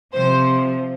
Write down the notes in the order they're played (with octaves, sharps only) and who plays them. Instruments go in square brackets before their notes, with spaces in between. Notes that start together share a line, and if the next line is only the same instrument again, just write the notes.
[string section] C3 F3 C5